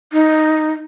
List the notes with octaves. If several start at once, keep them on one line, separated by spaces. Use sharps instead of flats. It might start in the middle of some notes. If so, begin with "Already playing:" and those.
D#4